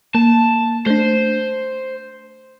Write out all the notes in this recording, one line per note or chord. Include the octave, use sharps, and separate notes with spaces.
A#3 A5
A3 D4 C5